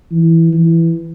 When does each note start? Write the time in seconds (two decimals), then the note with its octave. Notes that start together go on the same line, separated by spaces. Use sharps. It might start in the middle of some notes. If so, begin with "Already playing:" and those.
0.11 E3
0.53 E3